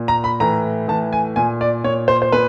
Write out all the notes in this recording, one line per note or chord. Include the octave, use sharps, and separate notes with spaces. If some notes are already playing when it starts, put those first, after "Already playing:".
Already playing: A#2
A#5
B5
A2 E3 A#5
A2 E3 A5
G#5
A#2 G#5
D5
A#2 C#5
C5
C5
A#2 B4